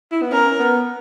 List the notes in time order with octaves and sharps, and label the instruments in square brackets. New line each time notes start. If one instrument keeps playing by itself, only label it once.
[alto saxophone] E4
B3
[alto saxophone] C#4 [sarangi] A#4
[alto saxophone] B3